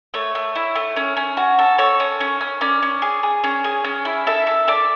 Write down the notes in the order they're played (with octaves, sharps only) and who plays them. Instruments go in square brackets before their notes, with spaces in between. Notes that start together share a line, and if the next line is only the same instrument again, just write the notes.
[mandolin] A3 C#5
A3
E4
A3
C#4
C#4
F#4
A4
A4 C#5
C#4
C#4
C#4
C#4 D5
C#4
G#4
G#4
C#4
G#4
C#4
E4
A4 E5
A4
A4 D5